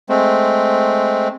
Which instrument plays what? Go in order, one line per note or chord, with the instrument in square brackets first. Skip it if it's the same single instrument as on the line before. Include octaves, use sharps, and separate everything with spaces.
[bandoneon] G#3 A3 C4